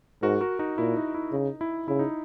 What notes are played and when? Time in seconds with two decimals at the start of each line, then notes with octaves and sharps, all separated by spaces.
0.22 G#2 F#4 A#4
0.41 F#4 A#4
0.59 D#4 F#4
0.78 A#2 E4
0.96 D#4
1.14 E4
1.32 C#3 D#4
1.61 E4
1.88 C#3 E4
1.99 D#4